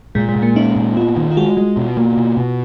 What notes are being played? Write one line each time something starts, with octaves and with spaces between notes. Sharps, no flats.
A#2 G#3
G#3
A#2
A#3
C#4 D#4
A#2
B3 F4
D#3
F4
G#3 F#4
G#3
B2
A#3
B2
B2